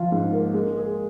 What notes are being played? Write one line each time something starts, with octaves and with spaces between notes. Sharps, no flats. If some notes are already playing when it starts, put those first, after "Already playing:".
Already playing: F3 F4
G#2
A#3
G#3
G#4